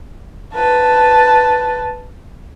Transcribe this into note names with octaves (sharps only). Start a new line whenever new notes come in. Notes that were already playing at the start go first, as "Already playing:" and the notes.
B4 A5